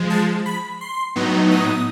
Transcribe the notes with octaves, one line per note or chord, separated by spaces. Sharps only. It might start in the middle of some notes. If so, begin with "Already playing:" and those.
Already playing: F3 G#3
A5
B5
C6
A2 F#3 B3 D#4
D#6